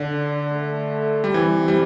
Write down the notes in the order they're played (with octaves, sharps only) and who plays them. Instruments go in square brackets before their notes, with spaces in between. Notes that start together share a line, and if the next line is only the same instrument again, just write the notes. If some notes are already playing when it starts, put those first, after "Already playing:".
Already playing: [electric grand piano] D3 [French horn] D4
[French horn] A3
[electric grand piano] G3
[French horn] C3 [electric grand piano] E3
[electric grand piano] G3